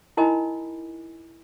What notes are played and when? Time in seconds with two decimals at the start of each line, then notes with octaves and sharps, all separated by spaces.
0.17 D#4 E4 A#4 D#5 G#5 B5